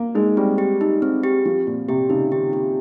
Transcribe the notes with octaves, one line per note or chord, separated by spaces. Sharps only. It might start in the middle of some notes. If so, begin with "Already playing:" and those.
Already playing: A#3
G#3 D#4
G3 C4
G4
D#4
C4
G4
F3 C4
A#2 C4
C3 G4
C#3 D#4
D#3 G4
G4